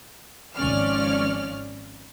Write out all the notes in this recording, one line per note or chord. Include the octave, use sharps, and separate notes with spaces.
G#1 F3 C#4 D5 F6